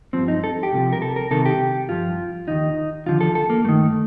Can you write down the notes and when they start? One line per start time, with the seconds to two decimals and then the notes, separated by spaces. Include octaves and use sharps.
0.13 G2 F3 C4
0.28 D#4
0.44 A4
0.63 G4
0.72 C2 C3 F3
0.93 A#4
1.02 A4
1.16 A#4
1.31 C2 C3 D#3 A4
1.45 G4
1.89 G2 F3 F4
2.48 D#2 D#3 D#4
3.06 D#2 D3 F3 F4
3.21 A4
3.35 A4
3.50 A#3
3.65 G2 D#3 A3